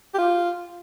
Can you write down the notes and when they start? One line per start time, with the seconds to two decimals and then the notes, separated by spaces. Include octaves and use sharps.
0.14 G4
0.18 F4